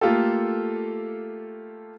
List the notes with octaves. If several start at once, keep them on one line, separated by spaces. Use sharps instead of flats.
A3 A#3 F4 G4 A4